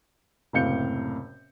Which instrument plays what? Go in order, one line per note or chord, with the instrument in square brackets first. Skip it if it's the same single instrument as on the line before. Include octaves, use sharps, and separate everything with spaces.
[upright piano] F#1 A2 C3 F5 G6 C#7